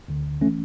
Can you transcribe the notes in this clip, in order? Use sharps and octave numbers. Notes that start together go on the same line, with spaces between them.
D2 D3
E3 A3 C#4